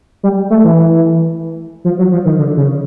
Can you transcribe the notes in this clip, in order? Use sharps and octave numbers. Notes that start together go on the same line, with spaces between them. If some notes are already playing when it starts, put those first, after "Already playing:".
G3
A3
E3
F3
F#3
F3
D#3
D3
C#3